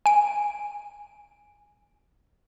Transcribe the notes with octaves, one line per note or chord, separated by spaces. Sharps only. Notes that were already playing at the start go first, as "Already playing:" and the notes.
G#5 D7